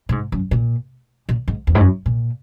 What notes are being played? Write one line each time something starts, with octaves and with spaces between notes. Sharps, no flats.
A#2
G#2
F#2
A#2
A#2
G#2
E2
G#2
F#2
A#2